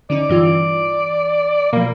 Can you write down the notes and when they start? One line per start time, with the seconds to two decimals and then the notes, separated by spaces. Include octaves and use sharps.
0.10 D3 C#4 D#4 D5
0.29 G2 E3 F4
1.73 B2 F3 A#3